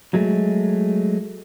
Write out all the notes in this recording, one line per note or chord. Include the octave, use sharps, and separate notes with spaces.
F#3 G#3 A3